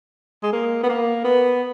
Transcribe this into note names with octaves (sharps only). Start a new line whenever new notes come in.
G#3
A#3
B3
A#3
B3